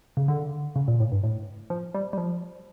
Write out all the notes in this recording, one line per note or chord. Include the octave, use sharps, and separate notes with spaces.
C#3
D3
C#3
A#2
A2
G2
A2
F3
G3
G3
F3